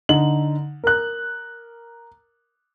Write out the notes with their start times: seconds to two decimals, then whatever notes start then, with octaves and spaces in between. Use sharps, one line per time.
0.09 D3 D#4 F#7
0.84 A#4 F#6